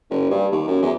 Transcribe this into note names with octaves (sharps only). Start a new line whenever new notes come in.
F#1
G2
D#2
F#2
E2